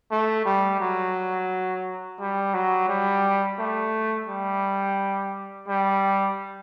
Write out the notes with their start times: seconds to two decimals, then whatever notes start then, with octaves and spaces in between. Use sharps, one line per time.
0.11 A3
0.45 G3
0.80 F#3
2.20 G3
2.54 F#3
2.89 G3
3.59 A3
4.28 G3
5.68 G3